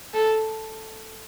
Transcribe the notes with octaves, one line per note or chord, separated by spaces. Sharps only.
A4